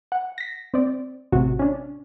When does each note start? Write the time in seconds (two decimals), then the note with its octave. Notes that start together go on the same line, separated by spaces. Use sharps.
0.12 F#5
0.38 A#6 B6
0.74 C4 D5
1.32 A1 C3 F#4
1.59 C#4 D4